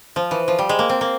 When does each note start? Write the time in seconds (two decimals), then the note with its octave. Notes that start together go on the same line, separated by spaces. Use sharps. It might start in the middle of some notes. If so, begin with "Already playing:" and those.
0.16 F3
0.31 E3
0.48 F3
0.59 G3
0.69 G#3
0.79 A#3
0.89 C4
1.01 A#3